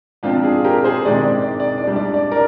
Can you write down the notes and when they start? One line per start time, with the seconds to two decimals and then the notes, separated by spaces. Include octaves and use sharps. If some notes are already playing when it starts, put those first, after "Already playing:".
0.23 G#2 F3 C4 D4 F4
0.44 F4 G#4
0.64 G4 A#4
0.84 G#4 C5
1.05 G#2 D#3 G#3 C4 D5
1.23 D5
1.42 D5
1.60 D5
1.78 D5
1.87 G#2 G3 D4
1.96 D5
2.14 D5
2.31 A#4 D5